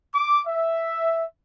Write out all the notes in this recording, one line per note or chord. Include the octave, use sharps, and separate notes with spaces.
D6
E5